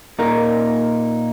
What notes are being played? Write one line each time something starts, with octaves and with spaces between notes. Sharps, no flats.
A#2 A#3 D#4 A#4